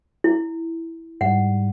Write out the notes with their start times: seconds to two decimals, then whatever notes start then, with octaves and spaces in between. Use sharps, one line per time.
0.24 E4
1.21 G#2 G3 F#5